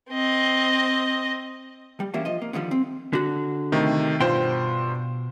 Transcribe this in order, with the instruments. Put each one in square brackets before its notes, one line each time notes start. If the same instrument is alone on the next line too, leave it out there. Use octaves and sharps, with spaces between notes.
[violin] C4 D#5
[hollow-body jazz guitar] G3
E3 G3 A#3 C#4 D4 F#4
F3 D#5
A#3
D3 D#3 F3 G3
C4
D3 F#4
[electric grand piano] C3 D#3 A3
[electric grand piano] G2 F4 C5 [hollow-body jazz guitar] B2 G5 C6